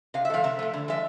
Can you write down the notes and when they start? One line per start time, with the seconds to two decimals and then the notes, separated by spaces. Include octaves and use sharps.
0.14 C3 F5
0.25 E5
0.30 F3 A3 F5
0.44 C3 E5
0.59 F3 A3
0.74 D3
0.88 F3 G#3 E5